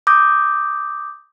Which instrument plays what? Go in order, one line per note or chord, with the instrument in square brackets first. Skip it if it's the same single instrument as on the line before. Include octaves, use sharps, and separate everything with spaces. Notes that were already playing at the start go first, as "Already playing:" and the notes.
[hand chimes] D6 D#6 G6 A#6